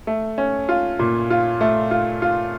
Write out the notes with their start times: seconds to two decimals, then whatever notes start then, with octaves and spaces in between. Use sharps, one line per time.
0.07 A3
0.38 C#4
0.69 F4
0.99 A#2
1.30 F4
1.61 A3
1.91 F4
2.22 F4